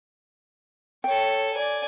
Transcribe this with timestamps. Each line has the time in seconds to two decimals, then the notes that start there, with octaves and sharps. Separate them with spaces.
1.04 A4 C#5 G5
1.53 D5 G#5